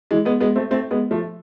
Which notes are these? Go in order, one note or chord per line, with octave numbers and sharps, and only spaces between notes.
E3 G#3
G#3 B3
G#3 B3
A3 C4
A3 C4
G#3 B3
F3 A3